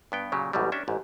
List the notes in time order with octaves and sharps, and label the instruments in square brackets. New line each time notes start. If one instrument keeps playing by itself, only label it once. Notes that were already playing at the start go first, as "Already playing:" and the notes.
[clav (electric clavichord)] G2 B3 G5
A#2 C#3 F#3 G4
A1 E2 G#2 B2 F#3 G3
C#4 D4 E5 G5
A1 G#2